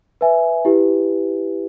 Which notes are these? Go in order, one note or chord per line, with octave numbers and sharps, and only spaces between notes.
B4 E5 G#5
E4 G4 B4